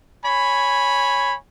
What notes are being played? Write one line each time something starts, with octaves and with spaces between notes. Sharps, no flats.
C#5 G#5 B5